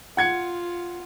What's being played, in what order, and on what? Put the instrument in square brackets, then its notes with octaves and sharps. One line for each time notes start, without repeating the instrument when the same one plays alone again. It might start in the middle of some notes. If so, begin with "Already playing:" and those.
[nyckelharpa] F4 [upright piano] F#5 G#6 C#7